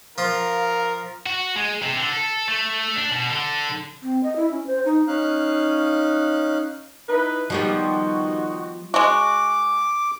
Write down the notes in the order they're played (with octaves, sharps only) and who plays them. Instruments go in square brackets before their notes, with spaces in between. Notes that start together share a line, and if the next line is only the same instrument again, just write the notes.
[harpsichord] F3 F4 [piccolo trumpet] A#4 [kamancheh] F5
[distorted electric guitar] F#4
G#3
C3
D3
A4
A3
D4
B2
D3
[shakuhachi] C4
D#5
E4
C#4
C5
D#4
[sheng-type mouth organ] C#4 D#4 F5 F#6
[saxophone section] D#4 E4 B4
[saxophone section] D#3 D#4 F#4 [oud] F3 G3 B3
[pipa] G#3 F#4 [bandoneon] D6